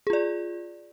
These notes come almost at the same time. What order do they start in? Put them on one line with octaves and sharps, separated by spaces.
G#4 F4 D5